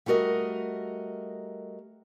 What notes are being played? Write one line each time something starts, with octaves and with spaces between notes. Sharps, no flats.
G3 A3 F#4 A#4 D#5